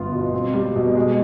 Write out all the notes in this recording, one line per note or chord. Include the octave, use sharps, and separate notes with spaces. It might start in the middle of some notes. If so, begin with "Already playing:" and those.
Already playing: G1 B3 F4
B2
C4
G3
B2
G#3